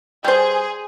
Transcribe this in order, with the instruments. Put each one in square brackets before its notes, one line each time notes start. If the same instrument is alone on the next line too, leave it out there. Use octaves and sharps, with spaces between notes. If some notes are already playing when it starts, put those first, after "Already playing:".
[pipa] G3 C5 [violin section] G#4